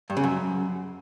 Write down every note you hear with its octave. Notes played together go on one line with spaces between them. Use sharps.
G2
C#3
F#2